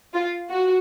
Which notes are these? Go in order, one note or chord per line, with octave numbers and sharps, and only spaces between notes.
F4
F#4